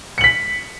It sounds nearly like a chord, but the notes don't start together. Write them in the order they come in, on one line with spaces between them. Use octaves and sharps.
C#7 F#7 B6